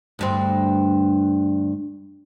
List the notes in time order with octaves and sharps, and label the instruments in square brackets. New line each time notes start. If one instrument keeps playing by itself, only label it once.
[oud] D2 G2 C4